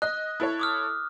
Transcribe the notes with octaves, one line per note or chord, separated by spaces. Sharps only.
D#5 F#6
E4 A4 C#5
D6 D#6 F6